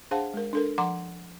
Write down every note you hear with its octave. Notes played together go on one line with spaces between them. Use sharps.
D4 G#4 C5 F5 F#5 A5
G#3 A#4
D4 A4 A#4
F3 F#5 A#5 C6 D6